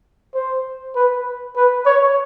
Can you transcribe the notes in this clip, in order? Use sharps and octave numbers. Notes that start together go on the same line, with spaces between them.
C5
B4
B4
C#5